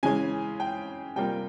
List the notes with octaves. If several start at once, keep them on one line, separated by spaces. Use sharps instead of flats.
C#3 E3 G#3 C#4 G#5
G5
C3 G3 A#3 F4 G5